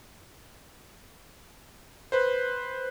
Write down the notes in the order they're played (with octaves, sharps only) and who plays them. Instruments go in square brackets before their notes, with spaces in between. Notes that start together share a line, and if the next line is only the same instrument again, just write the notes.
[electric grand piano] B4 C5